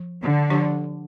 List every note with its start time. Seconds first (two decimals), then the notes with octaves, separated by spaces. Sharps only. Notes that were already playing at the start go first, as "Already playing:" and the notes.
Already playing: F3
0.21 D3
0.50 F3 D4 G4 D5